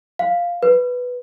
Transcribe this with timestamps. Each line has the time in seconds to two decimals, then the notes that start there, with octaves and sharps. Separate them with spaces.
0.19 F5
0.63 B4